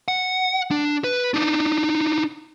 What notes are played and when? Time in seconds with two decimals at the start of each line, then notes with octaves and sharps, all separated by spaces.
0.08 F#5
0.71 D4
1.04 B4
1.34 D4 D#4